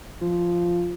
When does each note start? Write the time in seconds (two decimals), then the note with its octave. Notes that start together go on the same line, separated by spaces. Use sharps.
0.21 F3